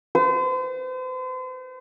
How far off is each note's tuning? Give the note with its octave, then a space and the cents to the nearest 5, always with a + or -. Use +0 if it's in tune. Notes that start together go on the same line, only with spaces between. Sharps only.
C5 -40